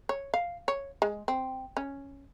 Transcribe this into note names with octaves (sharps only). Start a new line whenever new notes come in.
C#5
F5
C#5
G#3
C4
C#4